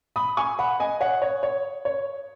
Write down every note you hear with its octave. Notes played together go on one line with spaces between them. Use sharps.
B5 D#6
G#5 C#6
F#5 B5
D#5 G#5
C#5 F#5
C#5
C#5
C#5